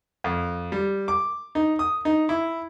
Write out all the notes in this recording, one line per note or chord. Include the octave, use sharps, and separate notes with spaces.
F2
G3
D6
D#4
D#6
D#4
E4